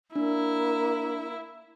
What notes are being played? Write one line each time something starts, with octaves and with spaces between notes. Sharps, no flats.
A#3 D4 E4